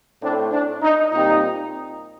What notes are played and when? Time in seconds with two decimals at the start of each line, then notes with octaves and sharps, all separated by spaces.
0.21 A2 A3 C4 D4
0.52 D4
0.82 D#4
1.12 A#2 G3 C4 D#4